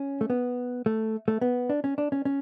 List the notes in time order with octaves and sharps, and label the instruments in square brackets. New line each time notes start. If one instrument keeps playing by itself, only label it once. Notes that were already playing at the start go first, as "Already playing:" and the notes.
Already playing: [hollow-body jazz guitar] C#4
A3
B3
A3
A3
B3
D4
C#4
D4
C#4
C#4